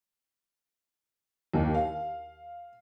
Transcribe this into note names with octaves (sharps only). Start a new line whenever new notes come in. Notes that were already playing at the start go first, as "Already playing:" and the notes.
D#2
F5